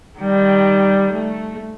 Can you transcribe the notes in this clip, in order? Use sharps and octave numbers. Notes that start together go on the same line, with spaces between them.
D#3 G3
A3